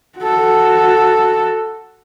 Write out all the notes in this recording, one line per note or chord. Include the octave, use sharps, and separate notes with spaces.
F#4 A4